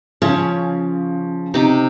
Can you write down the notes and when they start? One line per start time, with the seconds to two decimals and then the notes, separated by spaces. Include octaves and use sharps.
0.22 C#3 F3 C#4
1.54 C3 D#4 D6